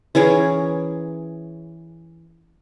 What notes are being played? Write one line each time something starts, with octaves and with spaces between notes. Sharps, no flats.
E3 C#4 G#4 A#4